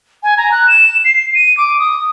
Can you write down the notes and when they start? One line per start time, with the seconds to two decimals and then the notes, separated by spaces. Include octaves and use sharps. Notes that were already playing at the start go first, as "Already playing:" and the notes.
0.23 G#5
0.37 A#5
0.52 F#6
0.68 E7
1.05 C7
1.35 D#7
1.57 D6
1.79 D#6